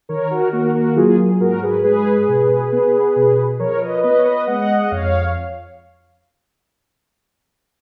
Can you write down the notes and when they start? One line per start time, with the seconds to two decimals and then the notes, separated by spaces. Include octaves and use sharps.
0.09 D#3 A#4 C#5
0.30 F#4 A#4
0.53 A#3 F#4 A#4
0.74 F#4 A#4
0.96 F#3 F4 G#4
1.31 G#4
1.40 G#2 F#4 A#4
1.63 G#4 B4
1.84 G#3 G#4 B4
2.28 B2
2.72 B3
3.16 B2
3.59 F3 A#4 C#5
3.81 B4 D#5
4.03 B3 B4 D#5
4.18 C#5
4.25 B4 D#5
4.47 G#3 D#5 F#5
4.80 D#5
4.91 F2 C#5 F5